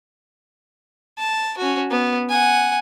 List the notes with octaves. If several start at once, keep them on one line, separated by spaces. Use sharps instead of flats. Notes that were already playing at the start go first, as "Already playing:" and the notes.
A5
C#4 F#4
B3
F#5 G#5